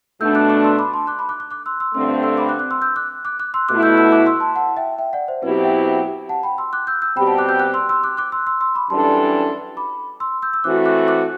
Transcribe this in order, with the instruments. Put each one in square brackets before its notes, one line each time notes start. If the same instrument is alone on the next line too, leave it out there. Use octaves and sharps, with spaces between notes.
[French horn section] B2 A3 D4 [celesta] E6 G6
[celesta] D6 F#6
D6 F#6
C6 E6
B5 D6
A5 C6
D6 F#6
B5 D6
D6 F#6
D6 F#6
D6 F#6
C6 E6
C6 E6
[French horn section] G2 D3 A3 C4 [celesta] C6 E6
[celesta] C6 E6
B5 D6
D6 F#6
D6 F#6
C6 E6
E6 G6
D6 F#6
D6 F#6
D6 F#6
C6 E6
[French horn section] B2 A3 E4 [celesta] D6 F#6
[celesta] E6 G6
E6 G6
D6 F#6
C6 E6
A5 C6
F#5 A5
E5 G5
E5 G5
D5 F#5
C5 E5
[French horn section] B2 F#3 C4 E4 G4 [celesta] B4
[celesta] E5 G5
F#5 A5
G5 B5
C6 E6
D6 F#6
E6 G6
E6 G6
[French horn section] B2 G3 C4 G4 [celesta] G5 B5
[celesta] F#5 A5
D6 F#6
E6 G6
D6 F#6
C6 E6
C6 E6
D6 F#6
D6 F#6
C6 E6
C6 E6
C6 E6
B5 D6
[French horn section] F#2 E3 G3 D4 A4 [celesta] A5 C6
[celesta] B5 D6
C6 E6
E6 G6
E6
[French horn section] E3 A3 C4 F#4 [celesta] D6 F#6
[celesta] D6 F#6
D6 F#6